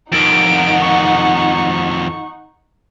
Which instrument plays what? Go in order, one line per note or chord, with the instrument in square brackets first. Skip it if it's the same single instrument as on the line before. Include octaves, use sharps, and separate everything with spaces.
[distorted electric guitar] F2 D#3 [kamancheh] D#4 F#5 [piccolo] D7
[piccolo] C#6